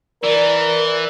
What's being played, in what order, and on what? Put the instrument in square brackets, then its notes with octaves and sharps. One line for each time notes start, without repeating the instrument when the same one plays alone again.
[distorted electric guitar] E3 [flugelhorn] A#4 [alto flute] D5